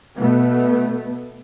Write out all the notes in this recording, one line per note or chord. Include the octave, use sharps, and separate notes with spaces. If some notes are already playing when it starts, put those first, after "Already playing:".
B2 A3 B3